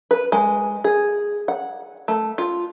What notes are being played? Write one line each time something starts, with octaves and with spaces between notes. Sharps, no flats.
B4
G#3
G#4
F#5
A3
F4